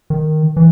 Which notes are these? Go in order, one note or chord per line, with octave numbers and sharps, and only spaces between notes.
D#3
E3